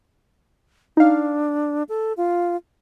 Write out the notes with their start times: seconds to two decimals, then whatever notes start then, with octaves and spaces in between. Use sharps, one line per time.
0.97 D4 D#4 F5
1.89 A4
2.17 F4